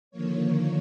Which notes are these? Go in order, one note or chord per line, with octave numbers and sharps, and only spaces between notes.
D3 D#3 F3 A#3 C#5